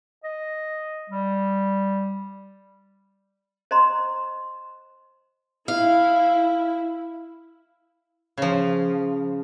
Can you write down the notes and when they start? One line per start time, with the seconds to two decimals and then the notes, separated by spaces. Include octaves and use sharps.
0.24 D#5
1.10 G3
3.71 C5 D#5 A#5 C6
5.68 E4 F5
8.38 C#3 F3